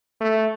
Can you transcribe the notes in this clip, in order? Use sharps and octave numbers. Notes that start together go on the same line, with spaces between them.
A3